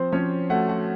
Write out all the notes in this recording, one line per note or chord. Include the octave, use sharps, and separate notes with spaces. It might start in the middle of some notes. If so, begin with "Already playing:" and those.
Already playing: F3 C4 C5
F3 C#4 C#5
A3 F#4 F#5
F#4 F#5